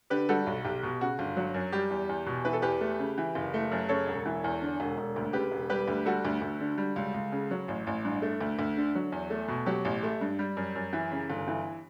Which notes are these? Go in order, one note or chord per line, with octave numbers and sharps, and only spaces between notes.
D3 G4 B4
G3 F#4 A4
B1
B1 G4
B2
C#3 F#4
G1
F#3
F#2
G3 G4
E2
E2
B2
E3 B4
A4
E2 G4 B4
A3
C#3
E3
F#1
A3
F#2
C#3 A4 C#5
E1
E3
E2
D3
E1
E1
D2
C#3 G4 B4
E1
G3 G4 B4
D2
G3 F#4 A4
D2
D2
D3
G3
C#2
C#2
C#3
F#3
A1
A1
G2
A3
D2
D2
D3
F#3
E2
A3
B2
F#3 G4
A1
A3
G2
G3
F#2
F#2
E3
C#3
G1
E3